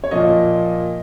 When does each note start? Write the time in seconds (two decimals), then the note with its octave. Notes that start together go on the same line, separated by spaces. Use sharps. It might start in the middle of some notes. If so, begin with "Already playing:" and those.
0.04 C#5
0.11 A#2 F3 A#3 D#5